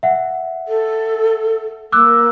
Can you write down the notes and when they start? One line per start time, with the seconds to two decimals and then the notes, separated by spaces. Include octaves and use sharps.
0.03 E5 F#5
0.68 A4
1.92 A#3 D6 E6 F#6